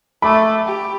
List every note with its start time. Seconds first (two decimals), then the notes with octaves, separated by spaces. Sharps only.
0.22 A3 B5 D6
0.66 G4